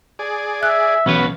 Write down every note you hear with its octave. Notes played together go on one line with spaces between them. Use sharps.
G#4 D5
E5 F#6
B1 E3 B3 C#4 F#4 B4